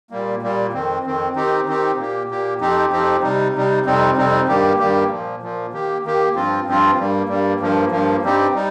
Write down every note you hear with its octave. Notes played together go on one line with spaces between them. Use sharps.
A#2 G3 A#3
A#2 G3 A#3
F2 D#3 C4
F2 D#3 C4
D#3 C4 D#4 G4
D#3 C4 D#4 G4
A#2 A#3 G4
A#2 A#3 G4
F2 F3 C4 D#4 G4
F2 F3 C4 D#4 G4
C3 G3 D#4
C3 G3 D#4
F2 C3 G3 C4 D#4
F2 C3 G3 C4 D#4
G2 D#3 G3 A#3 G4
G2 D#3 G3 A#3 G4
A#2 F3 A#3
A#2 F3 A#3
D#3 A#3 G4
D#3 A#3 G4
G2 F3 C4 F4
G2 F3 C4 F4
G2 G3 A#3
G2 G3 A#3
G2 F3 A#3
G2 F3 A#3
G2 G3 C4 D#4 G4
G3 D#4